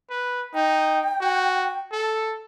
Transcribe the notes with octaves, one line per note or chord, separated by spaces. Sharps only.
B4
D#4 G5
F#4
A4